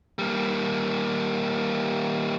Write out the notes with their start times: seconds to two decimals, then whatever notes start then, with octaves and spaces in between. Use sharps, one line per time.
0.19 G3 A#3